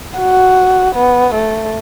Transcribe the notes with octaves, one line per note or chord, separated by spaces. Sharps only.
F#4
B3
A3